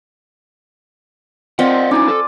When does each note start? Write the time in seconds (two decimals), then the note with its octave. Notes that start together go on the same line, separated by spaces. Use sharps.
1.59 C4 F4 D5 D#5 F#5
1.91 C#4 D#4 E4 D5 G#5
2.08 A4